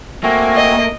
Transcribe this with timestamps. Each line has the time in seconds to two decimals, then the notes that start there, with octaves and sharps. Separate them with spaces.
0.23 A3 A#3 C4 F#4 G#5
0.56 D#5